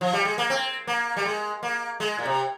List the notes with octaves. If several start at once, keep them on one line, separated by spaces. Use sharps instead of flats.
F3
G3
G#3
A#3
C4
A#3
G3
G#3
A#3
G#3
A#2
C3